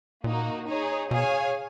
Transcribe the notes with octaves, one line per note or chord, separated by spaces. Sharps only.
A#2 A#3 D#4 F#4
D#4 G#4 C#5
B2 G#4 C#5 F5 G#5